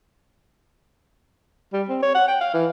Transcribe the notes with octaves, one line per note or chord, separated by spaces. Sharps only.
G3
C4
C#5
F#5
G5
F5
E3